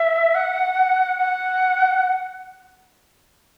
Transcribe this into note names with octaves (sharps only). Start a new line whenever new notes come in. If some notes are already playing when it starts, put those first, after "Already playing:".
Already playing: E5
F#5
F#5